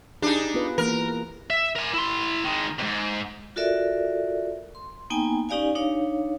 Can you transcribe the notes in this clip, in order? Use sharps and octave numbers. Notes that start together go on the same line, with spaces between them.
D4 D#4 G4 G#4
B3 F4 B4
E3 A#3 A#4
E5
A#4 G#5
E4 C6
D#3 G#3
F2 G#2
F4 F#4 A4 A#4 D5 E5
C6
A#3 B3 D#4 G5 G#5
C#4 D#4 G4 D5 F5 G#5
D4 D#4 C#5 F5